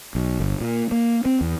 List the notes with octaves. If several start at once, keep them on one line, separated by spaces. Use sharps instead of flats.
B1
G1
A#2
A#3
C4
E2